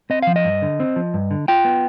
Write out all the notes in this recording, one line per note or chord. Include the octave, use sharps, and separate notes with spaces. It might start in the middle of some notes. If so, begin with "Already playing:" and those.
C4 D#5
F3 F5
D#5
G2
D3
C4
F3
G2
D3
F4 G5
B3